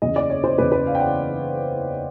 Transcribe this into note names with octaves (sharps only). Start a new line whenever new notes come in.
F#1 E2 C#3 D#5
D5
C#5
C5
F#1 E2 C#3 B4
B4
F5
G5
F#5